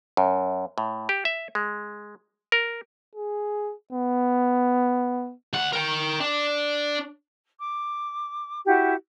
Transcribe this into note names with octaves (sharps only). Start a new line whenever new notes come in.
F#2
A2
G4
E5
G#3
A#4
G#4
B3
D2 F#5
A#4 G5
D4
D6
E4 F#4 G4 F#5